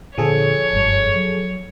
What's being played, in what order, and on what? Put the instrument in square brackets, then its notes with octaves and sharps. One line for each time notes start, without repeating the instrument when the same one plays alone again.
[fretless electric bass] A#2 D3 [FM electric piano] F3 G#4 A4 [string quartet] C#5
[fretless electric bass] F#1 G2
F#3